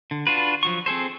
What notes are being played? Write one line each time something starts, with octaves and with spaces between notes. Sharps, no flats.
D3
D4 F4 F#4 B4
F3 F#3 C#6
C4 G#4 A4 C5